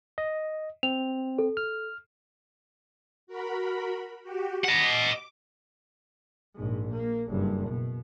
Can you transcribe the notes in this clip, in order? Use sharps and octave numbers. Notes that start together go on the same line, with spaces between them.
D#5
C4 F7
A4
F6
F#4 A#4 B5
F#4 G4
D#5 F#5 D6
A#1 G#2
A#3
F#1 G2
B2